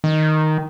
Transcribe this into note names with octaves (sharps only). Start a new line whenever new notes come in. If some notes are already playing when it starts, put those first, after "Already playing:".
D#3